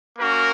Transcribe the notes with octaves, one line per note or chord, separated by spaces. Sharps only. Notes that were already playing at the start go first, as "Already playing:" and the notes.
A#3 C#4 F#4 A#4